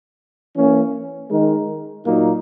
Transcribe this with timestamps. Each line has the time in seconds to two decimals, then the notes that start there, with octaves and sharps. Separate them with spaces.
0.55 E3 A#3 C#4
1.30 D#3 G#3 D#4 A#4
2.05 A#2 F#3 A#3 D#4